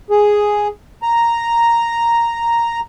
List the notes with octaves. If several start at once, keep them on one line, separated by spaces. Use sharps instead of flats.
G#4
A#5